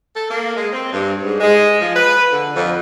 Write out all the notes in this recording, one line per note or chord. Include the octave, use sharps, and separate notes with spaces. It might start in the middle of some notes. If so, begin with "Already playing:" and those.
A4
A#3
G#3
C4
G2
G#2
G#3
F3
B4
D3
F2